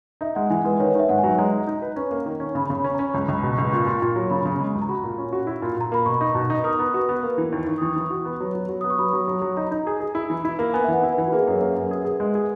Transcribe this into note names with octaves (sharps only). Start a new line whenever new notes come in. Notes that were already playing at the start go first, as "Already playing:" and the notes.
D#4 E5
G#3 F#5
E3 G#5
G#3 B4
D#3 C#5
D#3 E5
G#2 F#5
G#5
F#3
G#3 A#5
D#4
D#4
B4
C#4
A#3
D#3
C#4
C#3 B5
C#3
B5
C#4
A#5
C#4
C#2 A#5
C#2 B5 C#6
B2
C#6
C#2
A#2 C#6
A#2 B5
A#2
F#3
C#3 B5
C#3
G#3
C#2
A#5
F#4 B5
A#2
C#4
F#4
E4
A#2
A#2 A#5
A#3 B5
B2 C#6
D#4
B2
D#4
A#4 D#6
B3
F#4
B3
A#3
E3
D#2
D#2
D#6
E3 C#6
E3
F#4
B3
F#3
F#3
F#3
B3 D#6
C#6
F#3 B5
F#3
F#3
F#3
D#4 A#5
D#4
G#4
G#4
E4
E3
E4
A#3
B3 G#5
E5
E3 F#5
E4
B4
E3
F#4
A#3 G#4
F#2 G#4 A#4
A#3
F#2
G#4
G#4
G#3
G#4